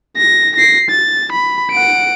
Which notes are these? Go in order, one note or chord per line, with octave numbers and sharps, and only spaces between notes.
A#6
A#6 C7
A6
B5
F#5 D7